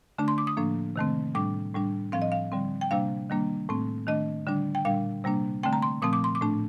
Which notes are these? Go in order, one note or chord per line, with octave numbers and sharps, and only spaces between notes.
D3 A3 D4
C6
D6
D#6
A2 F3 A#3 D4
C3 D#3 A3 C4
A2 G3 D4 D6
A2 G3 D4
A2 F3 C4 F5
D#5
F5
D3 G3 C4
G5
C3 G3 A#3 D4 F5
D#3 G3 A#3 D4
A2 A3 C4
D#3 A3 D4 D#5
D3 G3 D4
G5
A#2 G3 D4 F5
C3 G3 A#3 D4
D3 A3 C4 G5
A#5
C6
A#2 F3 A3 C4 D#6
D6
C6
D6
A2 A3 D4